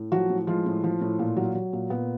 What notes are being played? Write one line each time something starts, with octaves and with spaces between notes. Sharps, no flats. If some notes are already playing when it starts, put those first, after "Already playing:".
Already playing: A2
F3 F#3 F#4
A2
F3 G#3 F4
A2
F3
A2
A#2
F#3
F#3
A#2
A#2 B3